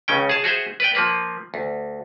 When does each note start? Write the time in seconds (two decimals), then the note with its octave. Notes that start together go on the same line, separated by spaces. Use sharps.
0.08 C#2 C#3 C#4 G5
0.29 G#4 A5
0.44 F#4 G#4 C5 E5
0.80 B4 D5 G5
0.95 F3 A#3 B4
1.54 D2